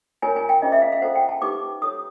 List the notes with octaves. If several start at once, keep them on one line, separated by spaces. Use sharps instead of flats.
F4 A#4 C#5 G#5
G#5
G5
C#4 F4 G#4 C5 D#5
E5
F5
F5
F4 A4 C5 F#5
G5
A5
D#4 G4 B4 D6
F4 A4 C#5 D#6